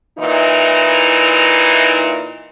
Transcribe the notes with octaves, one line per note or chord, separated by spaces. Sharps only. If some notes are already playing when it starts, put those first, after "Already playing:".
A#2 E3 D#4 E4